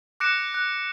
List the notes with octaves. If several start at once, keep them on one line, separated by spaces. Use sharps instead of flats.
D6 F#6 A#6 C#7 D7 E7
F#6